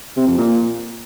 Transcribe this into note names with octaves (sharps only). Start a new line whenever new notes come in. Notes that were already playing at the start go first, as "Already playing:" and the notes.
C3
F2
A#2